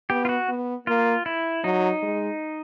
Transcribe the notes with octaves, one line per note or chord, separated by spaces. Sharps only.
B3 G4
F4
F#4
B3
A#3 F4
E4
F#3 D#4
G#3